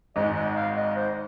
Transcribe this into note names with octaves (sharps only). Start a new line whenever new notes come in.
G#1 G#2 G#3 D#5
D#5
F5
D#5
C5